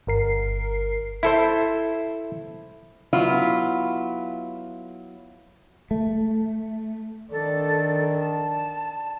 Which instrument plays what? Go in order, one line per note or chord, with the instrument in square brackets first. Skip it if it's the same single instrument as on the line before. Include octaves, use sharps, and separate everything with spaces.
[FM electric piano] G1 A#4 C7
[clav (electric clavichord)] E4 A4 C5
[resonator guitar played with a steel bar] F#3 B3 E4 F4
[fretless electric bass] A3
[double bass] D#3 D4 [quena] A4
[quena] A5